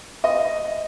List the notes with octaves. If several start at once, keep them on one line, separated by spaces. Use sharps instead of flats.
D#5